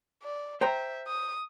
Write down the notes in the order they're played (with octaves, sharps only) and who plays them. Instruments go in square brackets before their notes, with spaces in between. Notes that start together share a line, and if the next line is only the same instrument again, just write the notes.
[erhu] D5
[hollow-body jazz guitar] C5 G5 A#5 [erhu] E5
[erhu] D#6